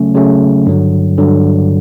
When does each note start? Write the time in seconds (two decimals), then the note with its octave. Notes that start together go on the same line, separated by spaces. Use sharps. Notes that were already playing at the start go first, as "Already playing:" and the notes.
Already playing: C#3 F#3 A3 C#4
0.15 C#3 F#3 A3 C#4
0.66 G2 D3 F#3
1.18 G2 D3 F#3